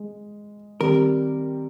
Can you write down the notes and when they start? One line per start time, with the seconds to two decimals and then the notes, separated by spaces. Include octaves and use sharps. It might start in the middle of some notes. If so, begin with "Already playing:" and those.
Already playing: G#3
0.80 D#3 G3 C4 G4 A#4